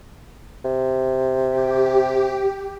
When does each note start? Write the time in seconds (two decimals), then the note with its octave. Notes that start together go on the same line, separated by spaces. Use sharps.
0.65 C3
1.48 G4